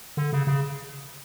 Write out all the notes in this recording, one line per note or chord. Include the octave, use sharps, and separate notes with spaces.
D3
C#3
C#3